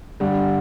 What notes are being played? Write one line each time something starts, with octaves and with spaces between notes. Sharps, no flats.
G2 D3 G3